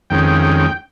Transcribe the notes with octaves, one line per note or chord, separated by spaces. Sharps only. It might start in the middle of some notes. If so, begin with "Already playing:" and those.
F2 D#3 G#3 C#4 G5